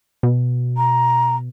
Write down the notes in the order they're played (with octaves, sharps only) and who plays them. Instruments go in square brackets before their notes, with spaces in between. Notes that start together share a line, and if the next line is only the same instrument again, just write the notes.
[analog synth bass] B2
[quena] A#5